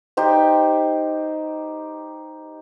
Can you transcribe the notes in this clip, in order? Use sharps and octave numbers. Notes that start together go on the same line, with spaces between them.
D#4 G4 C5 C6